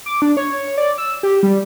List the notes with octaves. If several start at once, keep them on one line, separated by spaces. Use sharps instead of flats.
D6
D4
C#5
D5
E6
G4
G3